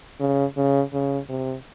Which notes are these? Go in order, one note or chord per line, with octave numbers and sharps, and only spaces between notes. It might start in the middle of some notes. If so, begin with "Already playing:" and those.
C#3
C#3
C#3
C3